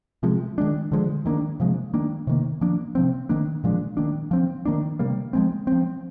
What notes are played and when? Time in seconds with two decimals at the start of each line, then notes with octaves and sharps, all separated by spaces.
0.23 C3 F3 G#3
0.58 D#3 G#3 D4
0.92 D3 F3 G#3
1.26 D#3 A#3 D4
1.60 C3 F3 G#3
1.94 D#3 A#3 D4
2.27 C3 D#3 A#3
2.61 F3 A#3 D4
2.95 C3 F3 C4
3.29 D#3 A#3 D4
3.64 A#2 F3 G#3 D4
3.97 D#3 A#3 D4
4.31 F3 C4
4.66 D#3 A#3 D4
4.99 C3 G3 A#3
5.33 F3 G#3 C4
5.67 C4
5.72 F3